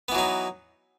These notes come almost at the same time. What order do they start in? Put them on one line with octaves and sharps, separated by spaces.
B3 E3 F#3 D#4